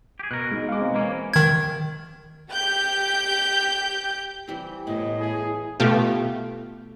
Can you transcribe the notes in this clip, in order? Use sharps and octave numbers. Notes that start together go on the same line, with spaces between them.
G4 G#4
B2 A#4 F#6
G#3 D#4
G#3 F5 D6
C4
E3 A#3 C#4
D#3 G#6
G4 G6
E3 G3 C4
A2 B3 E4 D#5
G#4
B2 A3 F4 G4